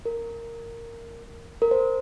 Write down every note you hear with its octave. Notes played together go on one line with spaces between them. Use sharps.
A#4
A#4
C5